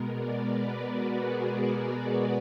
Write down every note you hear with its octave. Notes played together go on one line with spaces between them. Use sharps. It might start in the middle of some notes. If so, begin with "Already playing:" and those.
Already playing: B2 G#3 B3 A#4
D5
B4
F#4
G#4
F#4